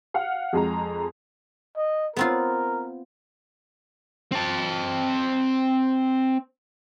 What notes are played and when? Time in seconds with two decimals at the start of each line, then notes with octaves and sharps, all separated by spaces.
0.14 F5 F#5 F6
0.53 F2 G#3 A#5
1.77 D#5
2.17 B3 C4 F4 A#4
4.32 C4 A5